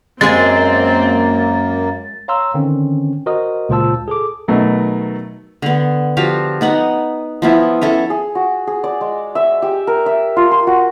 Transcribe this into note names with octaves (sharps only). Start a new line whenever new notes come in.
F#2 G#3 A#3 C4 G#4 A6
C#5 F5 A#5 C6 E6
D3 D#3 C4 C#4
F#4 A#4 C5 D#5 D#6
C#2 A#2 F4 C5 A5 E6
G#4 A4 D6
B2 D#3 F#3 A3
D3 B3
F3 F#4 G4 F5
B3 D#4 F#5
F3 B3 E4
C#4 E4 A4
G#4
F#4
G#4
D5
G#3
E5
G4
A#4
E5
F4
C6
F#4